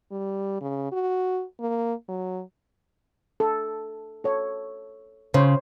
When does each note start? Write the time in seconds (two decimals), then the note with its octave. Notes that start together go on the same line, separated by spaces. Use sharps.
0.12 G3
0.61 C#3
0.92 F#4
1.60 A#3
2.09 F#3
3.40 A4
4.24 A4 C#5
5.34 C#3 C5 C#5